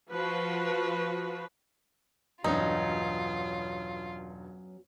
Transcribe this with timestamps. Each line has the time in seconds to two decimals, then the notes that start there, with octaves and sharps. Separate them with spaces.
0.11 F3 F#4 B4
2.44 E1 G2 F#3 B3 C#4 D#4 F4